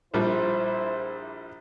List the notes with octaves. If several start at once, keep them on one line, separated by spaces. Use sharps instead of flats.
A#1 F3 G3 E4 C5